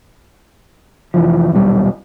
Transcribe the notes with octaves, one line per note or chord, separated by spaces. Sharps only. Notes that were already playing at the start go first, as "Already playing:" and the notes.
F1 E3 F3
D#1 B1 C#3 G3